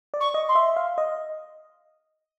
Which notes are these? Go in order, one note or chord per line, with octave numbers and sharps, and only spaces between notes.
D5
C#6
D#5
C6
E5
F5
D#5